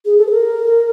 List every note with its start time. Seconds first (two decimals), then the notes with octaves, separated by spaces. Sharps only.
0.05 G#4
0.17 A4
0.27 B4
0.31 A#4